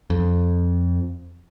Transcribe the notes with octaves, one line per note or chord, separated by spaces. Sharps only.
F2